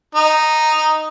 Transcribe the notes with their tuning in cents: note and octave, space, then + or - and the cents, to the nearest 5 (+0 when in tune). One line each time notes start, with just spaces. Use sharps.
D#4 -5